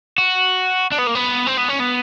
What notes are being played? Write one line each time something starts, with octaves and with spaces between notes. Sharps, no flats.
F#4
D4
B3
A#3
B3
C4
B3
C#4
B3